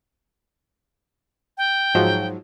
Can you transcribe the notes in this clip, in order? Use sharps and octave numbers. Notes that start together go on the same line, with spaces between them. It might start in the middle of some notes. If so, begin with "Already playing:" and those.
G5
G#2 F3 F#3